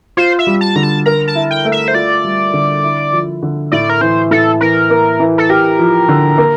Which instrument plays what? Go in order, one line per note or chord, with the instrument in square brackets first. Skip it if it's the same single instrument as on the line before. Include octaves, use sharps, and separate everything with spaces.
[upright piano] F4 [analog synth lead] C5
[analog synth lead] E5
[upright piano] G3
[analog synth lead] A5
[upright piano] D3 [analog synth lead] A#5
[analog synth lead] A5
[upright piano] A#4 [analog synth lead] A#5
[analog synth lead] A5
[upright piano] E4
[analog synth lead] G5
[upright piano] A3
[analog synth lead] E5
C5
[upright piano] F4 [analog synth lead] D5
[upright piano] G3
D3
E4
F3
D3
[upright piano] A2 [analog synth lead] D5
[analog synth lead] A#4
[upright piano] E3 [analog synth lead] C5
[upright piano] A2 [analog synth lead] A4
[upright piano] E3 [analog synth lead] A#4
[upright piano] A#3
E3
[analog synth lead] A4
[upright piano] G4 [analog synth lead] A#4
[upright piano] F3
D3
A#3